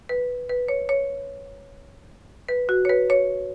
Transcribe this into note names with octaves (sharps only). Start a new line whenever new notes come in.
B4
B4
C#5
C#5
B4
F#4
C#5
B4
C#5